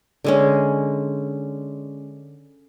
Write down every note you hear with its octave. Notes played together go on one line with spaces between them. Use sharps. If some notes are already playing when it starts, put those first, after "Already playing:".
D3 G#3 C#4